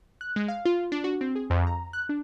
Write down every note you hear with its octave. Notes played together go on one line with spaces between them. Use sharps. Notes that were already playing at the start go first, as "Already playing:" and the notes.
F#6
G#3
F5
F4
D4
F#4
C4
G#4
F2
A#5
F#6
D4